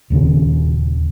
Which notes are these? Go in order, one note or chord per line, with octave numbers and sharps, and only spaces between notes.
D#1 D#2 C#3